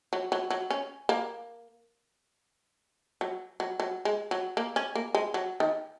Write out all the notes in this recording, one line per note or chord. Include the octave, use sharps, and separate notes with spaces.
F#3
F#3
F#3
C#4
A#3
F#3
F#3
F#3
G#3
F#3
A#3
C#4
A#3
G#3
F#3
D#3